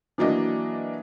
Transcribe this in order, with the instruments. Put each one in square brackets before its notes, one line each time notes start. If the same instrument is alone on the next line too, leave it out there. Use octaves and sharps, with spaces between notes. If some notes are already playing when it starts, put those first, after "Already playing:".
[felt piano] E3 F#3 A#3 D4 F#4 D#5